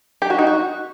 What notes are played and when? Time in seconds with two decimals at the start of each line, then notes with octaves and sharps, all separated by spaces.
0.22 G4
0.30 F#4
0.39 D#4
0.47 F#4